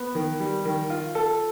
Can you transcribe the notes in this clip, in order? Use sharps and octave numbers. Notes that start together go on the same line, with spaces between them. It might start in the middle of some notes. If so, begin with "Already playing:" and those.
Already playing: B3
D#3
G3
D#3
F4
A4